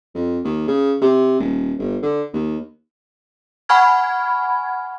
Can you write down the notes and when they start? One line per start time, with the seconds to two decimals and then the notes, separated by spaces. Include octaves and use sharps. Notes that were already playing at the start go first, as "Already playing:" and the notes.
0.15 F2
0.44 D#2
0.68 C#3
1.02 C3
1.39 D#1
1.78 G1
2.02 D3
2.33 D#2
3.69 F#5 G#5 B5 C#6 F6 G#6